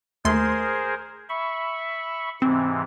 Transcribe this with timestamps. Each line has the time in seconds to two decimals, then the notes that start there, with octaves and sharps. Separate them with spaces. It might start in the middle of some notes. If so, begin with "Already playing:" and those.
0.25 D#2 A3 G#4 A#4 C5 C6
1.29 E5 B5 C#6
2.42 G#2 C3 E3 C4